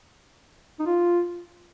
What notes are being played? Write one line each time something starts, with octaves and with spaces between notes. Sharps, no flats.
D#4
F4